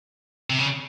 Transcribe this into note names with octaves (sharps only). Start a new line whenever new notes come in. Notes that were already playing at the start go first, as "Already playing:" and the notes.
C3
C#3